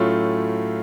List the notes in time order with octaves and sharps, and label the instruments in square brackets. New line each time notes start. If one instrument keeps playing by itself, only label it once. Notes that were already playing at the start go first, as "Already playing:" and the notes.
Already playing: [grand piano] A2 F#3 A3 C#4 F4